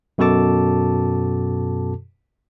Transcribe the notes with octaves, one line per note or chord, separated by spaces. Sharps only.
F#2 B2 F#4 A4 A5 D6